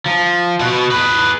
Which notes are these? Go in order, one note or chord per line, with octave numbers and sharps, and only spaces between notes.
F3
B2 F#4
G#4 B4